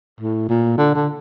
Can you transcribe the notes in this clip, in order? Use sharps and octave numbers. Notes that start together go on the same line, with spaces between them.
A2
A#2
D3
D3